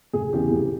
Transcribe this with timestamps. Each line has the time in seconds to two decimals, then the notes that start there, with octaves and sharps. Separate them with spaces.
0.13 F1 G#4
0.33 E2 C#3 E3 G4
0.52 F1